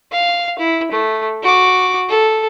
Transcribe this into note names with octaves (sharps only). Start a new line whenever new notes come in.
F5
E4
A3
F#4 D6
A4